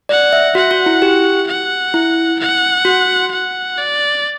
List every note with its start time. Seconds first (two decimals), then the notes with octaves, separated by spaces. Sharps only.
0.09 D5 F#5
0.33 E5
0.55 F#4 F#5
0.71 F#4
0.86 E4
1.02 G4
1.47 F#5
1.94 E4
2.39 F#5
2.85 F#4
3.31 F#5
3.78 D5